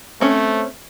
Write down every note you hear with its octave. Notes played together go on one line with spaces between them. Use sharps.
A3 C4 C#4